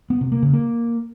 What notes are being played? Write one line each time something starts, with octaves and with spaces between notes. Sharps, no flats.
B3
C3
A#3
C#3
A#3